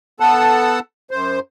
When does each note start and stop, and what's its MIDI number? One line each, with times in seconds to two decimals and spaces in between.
0.20 0.80 59
0.20 0.80 69
0.20 0.80 78
0.20 0.80 81
1.11 1.40 42
1.11 1.40 72